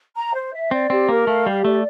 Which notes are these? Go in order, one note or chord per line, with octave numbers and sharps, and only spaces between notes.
A#5
C5
E5
C4 D5
C4 G4
A#3 A#4
A3 F5
G3 G4
A3 D5